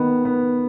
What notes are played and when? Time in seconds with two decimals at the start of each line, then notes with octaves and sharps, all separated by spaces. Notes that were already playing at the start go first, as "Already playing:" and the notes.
Already playing: D#3 B3
0.25 B3